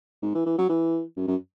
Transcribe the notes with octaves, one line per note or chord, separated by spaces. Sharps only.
G#2
E3
E3
F#3
E3
F#2
F#2